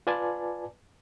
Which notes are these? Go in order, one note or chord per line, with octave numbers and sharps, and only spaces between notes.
F4 B4 D5 G#5 A5